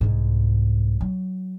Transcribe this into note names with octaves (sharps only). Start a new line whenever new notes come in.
C2 G#2
F#3